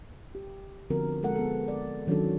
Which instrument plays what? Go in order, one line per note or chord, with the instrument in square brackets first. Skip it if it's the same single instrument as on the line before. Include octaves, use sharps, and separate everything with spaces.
[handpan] G4
D3 F3 B3 C4 F#4 A#4
G#3 A#3 A4 A#4 F#5
B3 A4
D5
D#3 F#3 C#4 D4 F#4 A4